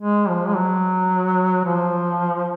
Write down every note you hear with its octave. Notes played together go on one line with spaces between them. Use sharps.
G#3
F3
G#3
F#3
F3